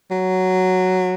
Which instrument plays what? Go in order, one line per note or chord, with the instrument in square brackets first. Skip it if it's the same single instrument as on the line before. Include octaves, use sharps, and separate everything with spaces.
[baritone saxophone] F#3